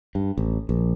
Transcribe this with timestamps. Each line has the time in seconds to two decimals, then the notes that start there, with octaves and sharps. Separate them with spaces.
0.15 G2
0.38 A1
0.69 A#1